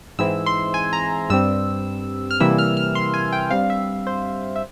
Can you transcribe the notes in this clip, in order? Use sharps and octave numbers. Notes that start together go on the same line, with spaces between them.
G#2 E3 G#3 C4 E4 E6
C6
G#5
A#5
G2 G3 C4 E6
F6
C3 E3 G3 A#3 E4 E6
F6
F6
C6
G#5
G5
G2 G3 C4 F5
E5
C5
E5